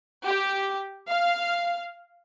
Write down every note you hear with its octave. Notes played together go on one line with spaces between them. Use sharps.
G4
F5